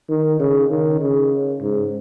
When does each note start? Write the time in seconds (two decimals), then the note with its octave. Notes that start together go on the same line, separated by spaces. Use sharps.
0.09 D#3
0.39 C#3
0.69 D#3
1.00 C#3
1.61 G#2